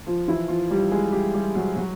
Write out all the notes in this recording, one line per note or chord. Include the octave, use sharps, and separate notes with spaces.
F3 F4
E3 E4
F3 F4
G3 G4
G#3 G#4
G3 G4
G3 G4
F#3 F#4
F#3 F#4